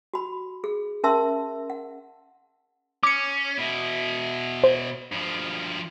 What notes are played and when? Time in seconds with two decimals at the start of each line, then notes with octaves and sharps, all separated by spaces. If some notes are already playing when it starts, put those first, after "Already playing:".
0.14 F#4 B5
0.64 G#4
1.04 C#4 A#4 E5 A5 C6 E6
1.70 F#5
3.03 C#4 D6 C#7
3.58 B2 E4
4.64 C5
5.12 G2 F3